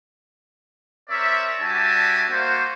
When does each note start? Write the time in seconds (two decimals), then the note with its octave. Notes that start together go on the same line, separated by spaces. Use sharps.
1.10 C4 A#4 C#5 D5 E5
1.60 G3 D4 F#4 E5 G#5 A5
2.30 A#3 F#4 C5